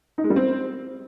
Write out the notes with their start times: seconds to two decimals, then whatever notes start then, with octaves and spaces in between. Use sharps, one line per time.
0.18 D#4
0.24 G#3
0.30 G3
0.36 C4